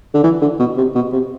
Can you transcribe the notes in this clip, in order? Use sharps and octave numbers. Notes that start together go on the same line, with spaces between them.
D3
E3
D3
B2
C3
B2
C3